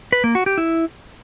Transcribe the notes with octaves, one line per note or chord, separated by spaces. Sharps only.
B4
A#3
F#4
G4
E4